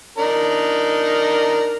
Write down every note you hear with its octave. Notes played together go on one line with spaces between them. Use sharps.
D4 D#4 A#4